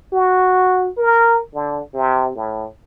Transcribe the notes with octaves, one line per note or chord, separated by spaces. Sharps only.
F#4
A#4
D3
C3
A2